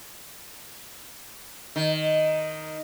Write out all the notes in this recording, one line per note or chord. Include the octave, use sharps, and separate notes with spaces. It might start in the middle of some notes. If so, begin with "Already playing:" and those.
D#3